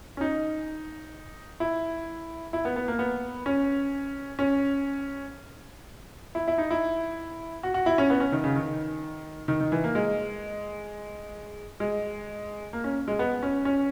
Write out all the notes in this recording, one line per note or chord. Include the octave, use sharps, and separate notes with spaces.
C#4
D#4
E4
E4
B3
B3
A#3
B3
C#4
C#4
E4
E4
D#4
E4
F#4
F#4
E4
C#4
B3
C#4
D#3
C#3
D#3
D#3
D#3
E3
A#3
G#3
G#3
A#3
C#4
G#3
B3
C#4
C#4